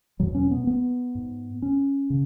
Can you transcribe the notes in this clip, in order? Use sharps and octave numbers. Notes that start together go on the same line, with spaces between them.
E2 B2 F#3
C#4
B3
B3
G#2
C#4
C#3